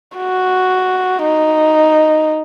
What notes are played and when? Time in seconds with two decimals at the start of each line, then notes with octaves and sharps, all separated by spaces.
0.18 F#4
1.23 D#4